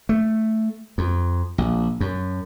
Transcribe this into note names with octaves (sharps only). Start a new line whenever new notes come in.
A3
F2
A#1
F#2